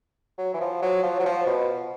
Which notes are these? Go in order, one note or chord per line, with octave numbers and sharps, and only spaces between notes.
F#3
E3
F3
F#3
F3
F#3
F3
B2